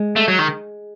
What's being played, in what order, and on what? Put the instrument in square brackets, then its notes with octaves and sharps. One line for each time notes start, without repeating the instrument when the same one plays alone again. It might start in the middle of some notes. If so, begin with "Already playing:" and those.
Already playing: [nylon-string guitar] G#3
[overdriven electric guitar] A3
F#3
D#3